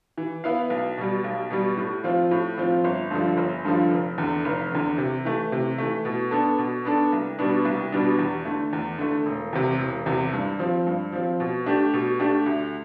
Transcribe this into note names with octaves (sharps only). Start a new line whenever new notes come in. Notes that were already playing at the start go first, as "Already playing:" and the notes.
E3
B3 E4 B4 F5
B1
B2 G3
B1
B2 G3
A2
F3 C4 F4
A2
F3 C4 F4
G1
G2 D3 F3
G1
G2 D3 F3
F1
E2 D3
F1
E2 D3
C3
E3 A3
C3
E3 A3
B2
B3 D4 A4
B2
B3 D4 A4
C2
B2 G3 B3 D4
C2
B2 G3 B3 D4
E2
D3 A3
E2
D3 A3
E1
E2 C3
E1
E2 C3
G2
F3 C4
G2
F3 C4
B2
A3 D4 G4
B2
A3 D4 G4
D2